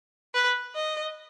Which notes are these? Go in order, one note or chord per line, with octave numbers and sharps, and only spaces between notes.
B4
D#5